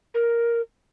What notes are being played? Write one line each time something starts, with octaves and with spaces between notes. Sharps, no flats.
A#4